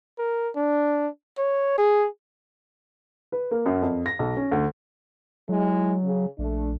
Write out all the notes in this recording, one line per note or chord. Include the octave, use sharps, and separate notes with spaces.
A#4
D4
C#5
G#4
B4
A#3
F#2
F2
A#6
B1
C#4
D2
F#3 G#3 E4
C#3
A#1 A3 D4